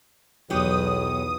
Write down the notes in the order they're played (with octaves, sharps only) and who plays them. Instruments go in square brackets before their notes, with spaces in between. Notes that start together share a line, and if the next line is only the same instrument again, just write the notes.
[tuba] B1 [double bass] E2 [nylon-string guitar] F#3 G4 [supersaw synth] D#6